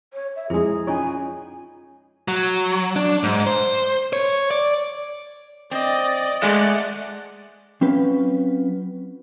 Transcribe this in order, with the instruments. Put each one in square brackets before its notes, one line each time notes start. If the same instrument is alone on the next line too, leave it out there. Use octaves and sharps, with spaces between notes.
[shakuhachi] C#5
E5
[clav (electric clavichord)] F2 G#3 [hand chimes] E4 [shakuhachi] G#4
[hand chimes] C#4 F4 [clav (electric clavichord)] D#4 C#5 [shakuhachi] G#5
[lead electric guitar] F#3
D4
G#2
C5
C#5
D5
[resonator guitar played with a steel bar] C4 [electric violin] D5 D#5
[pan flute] G#3 [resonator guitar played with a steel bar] A3 G#4 [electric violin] D5 F#5
[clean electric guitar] F#3 C4 C#4 F4 B4